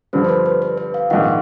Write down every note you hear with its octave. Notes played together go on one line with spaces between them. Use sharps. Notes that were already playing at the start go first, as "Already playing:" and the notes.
G2 D3 F3 C5
C5
B4
B4
B4
B4
F5
A#1 G#2 D#3 F#5